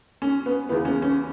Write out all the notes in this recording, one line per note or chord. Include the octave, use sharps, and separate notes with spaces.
C#4
B3
E2 C#3 E3 B3
C#4
C#4